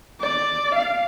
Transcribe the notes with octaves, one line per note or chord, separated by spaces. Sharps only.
D5
F5